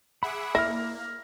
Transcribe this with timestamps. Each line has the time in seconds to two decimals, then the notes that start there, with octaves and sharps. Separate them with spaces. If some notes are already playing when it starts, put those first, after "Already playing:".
0.23 G#4 E5 F#5 B5 D6
0.55 A#3 E4 F6 A#6